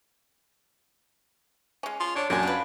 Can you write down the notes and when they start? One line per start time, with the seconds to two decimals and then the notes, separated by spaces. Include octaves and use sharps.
1.83 G#3 C#4
2.00 F4
2.15 D4 C#5
2.30 F#2 F#3 D4 G#5
2.43 F4 B4